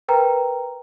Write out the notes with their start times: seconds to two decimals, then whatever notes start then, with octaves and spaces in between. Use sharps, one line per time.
0.08 A#4 B4 G5 A#5